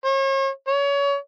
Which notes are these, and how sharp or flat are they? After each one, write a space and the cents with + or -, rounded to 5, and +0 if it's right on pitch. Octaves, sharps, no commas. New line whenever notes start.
C#5 -40
C#5 +30